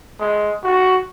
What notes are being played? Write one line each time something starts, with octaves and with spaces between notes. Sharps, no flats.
G#3
F#4